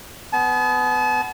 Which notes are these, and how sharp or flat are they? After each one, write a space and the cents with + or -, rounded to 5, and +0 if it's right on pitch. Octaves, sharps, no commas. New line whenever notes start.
B3 +20 A5 -40